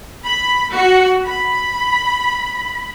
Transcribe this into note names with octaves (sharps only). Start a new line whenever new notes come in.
B5
F#4
B5